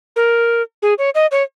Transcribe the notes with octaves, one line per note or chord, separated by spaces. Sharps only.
A#4
G#4
C#5
D#5
C#5